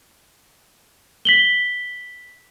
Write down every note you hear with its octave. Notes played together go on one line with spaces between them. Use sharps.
B6 F#7 G7